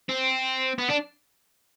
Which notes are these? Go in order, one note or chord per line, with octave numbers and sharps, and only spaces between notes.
C4
B3
D4